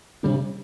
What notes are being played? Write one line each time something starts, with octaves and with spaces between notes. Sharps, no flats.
C3 G3 D4